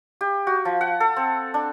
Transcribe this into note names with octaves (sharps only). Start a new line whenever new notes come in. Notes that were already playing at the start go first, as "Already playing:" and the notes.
G4
F#4
F3
F#5
A4
C4
D4